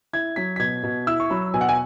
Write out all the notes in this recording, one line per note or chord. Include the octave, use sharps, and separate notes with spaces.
E4 G#6
F#3 B6
B6
B2 G#6
B2
E4 E6
C#6
F#3 B5
B2 G#5
F#5
G#5